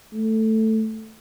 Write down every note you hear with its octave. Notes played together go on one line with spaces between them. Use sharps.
A3